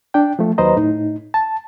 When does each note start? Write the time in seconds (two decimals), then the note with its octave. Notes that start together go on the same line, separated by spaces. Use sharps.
0.14 D4 G5
0.39 F3 A3
0.58 D#2 F#3 B4 C5 D#5 A#5
0.76 A2 D#4
1.34 A5